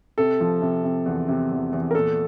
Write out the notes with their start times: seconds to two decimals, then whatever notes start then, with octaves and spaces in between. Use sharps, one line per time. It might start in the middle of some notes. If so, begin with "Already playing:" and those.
0.18 C3 A4
0.40 F3
0.62 C3
0.84 C3
1.06 E2
1.28 C3
1.51 E2
1.72 E2
1.91 A#4
1.94 A#2 A4